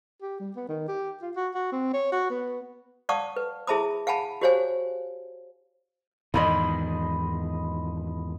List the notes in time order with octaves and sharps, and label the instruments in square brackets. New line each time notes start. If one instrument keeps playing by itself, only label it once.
[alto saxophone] G4
G3
B3
D#3
G4
F4
F#4
F#4
C4
C#5
F#4
B3
[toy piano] D5 F5 F#5 A5 C#6 D#6
B4
E4 G#4 E5 A5 B5 D#6
F5 F#5 G#5 A5 B5
F#4 G4 C5 C#5 F5 G#5
[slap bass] E2 G#2 D#3 [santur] D#5 B5 C6